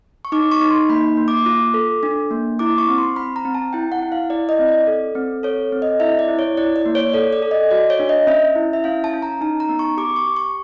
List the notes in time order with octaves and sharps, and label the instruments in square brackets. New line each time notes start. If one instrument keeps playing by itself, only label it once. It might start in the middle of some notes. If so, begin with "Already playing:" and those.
[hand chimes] C#6
D#4 D6
C#6
D#4
C6
A#3 B5
A#3
D6
F4
A4
D4
A#3
E4 D6
C#6
C4
C6
C4 B5
A#5
C4
A5
E4 G5
F#5
E4
F5
E4 D5
D#5
C4
D5
A4
C4
A4 C#5
C4
D#5
E4 E5
D5
E4
C#5
E4 D5
D5
A#3
C#5
A4 D5
D5
A4
D#5
F#4 D5
C#5
D4
D#5
C#4 E5
E4
E5
C#4 F5
A5
C#4
A#5
D#4 A5
A#5
B3
C#6
G4 D6
C#6
G4
C#6